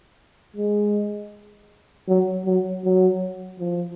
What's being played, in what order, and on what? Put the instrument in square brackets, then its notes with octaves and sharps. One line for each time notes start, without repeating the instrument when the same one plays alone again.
[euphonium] G#3
F#3
F#3
F#3
F3